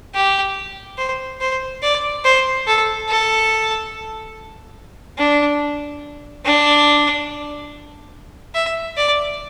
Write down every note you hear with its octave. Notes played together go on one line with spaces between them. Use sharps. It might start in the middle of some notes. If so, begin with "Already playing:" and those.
G4
C5
C5
D5
C5
A4
A4
D4
D4
E5
D5